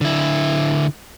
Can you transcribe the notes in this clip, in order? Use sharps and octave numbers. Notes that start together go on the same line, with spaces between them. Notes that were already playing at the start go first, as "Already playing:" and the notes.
D3 E4